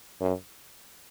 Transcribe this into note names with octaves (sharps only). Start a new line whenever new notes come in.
F#2